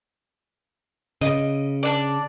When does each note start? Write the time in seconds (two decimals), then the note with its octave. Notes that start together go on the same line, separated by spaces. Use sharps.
1.21 C#3 D#5
1.83 D4 D5